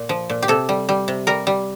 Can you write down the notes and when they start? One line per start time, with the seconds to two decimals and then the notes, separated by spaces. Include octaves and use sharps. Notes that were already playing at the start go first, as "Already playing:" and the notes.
Already playing: A#2
0.09 F3
0.30 A#2
0.42 G4
0.48 C3 A4
0.69 G3
0.89 G3
1.08 C3
1.27 G3 A#4
1.47 G3